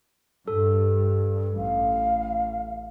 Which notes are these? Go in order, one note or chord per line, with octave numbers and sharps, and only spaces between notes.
G2 A4
A1 F5